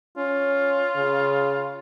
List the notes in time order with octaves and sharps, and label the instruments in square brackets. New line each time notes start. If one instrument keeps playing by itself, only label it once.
[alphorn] C#4 [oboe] F4
[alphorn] C#3